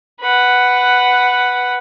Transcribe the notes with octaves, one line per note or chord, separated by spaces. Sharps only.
B4 F#5